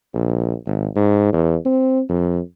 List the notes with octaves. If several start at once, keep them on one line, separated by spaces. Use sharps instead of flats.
A#1
G#1
G#2
E2
C4
F2